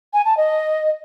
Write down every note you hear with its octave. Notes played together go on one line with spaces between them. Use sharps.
G#5
A5
D#5